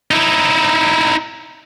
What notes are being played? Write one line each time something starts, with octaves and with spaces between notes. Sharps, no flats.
D#4 E4